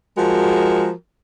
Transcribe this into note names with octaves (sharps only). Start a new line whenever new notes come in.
F3 G#3 F#4 A#4